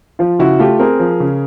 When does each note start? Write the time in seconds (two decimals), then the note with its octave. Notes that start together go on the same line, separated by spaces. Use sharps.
0.19 F3 F4
0.39 C#3 E4 F#4
0.59 A3 F4 G4
0.79 C4 G#4 A#4
1.00 F3
1.20 C#3